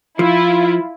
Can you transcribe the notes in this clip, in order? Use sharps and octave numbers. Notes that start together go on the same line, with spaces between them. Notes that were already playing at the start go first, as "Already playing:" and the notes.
F3 E4 F4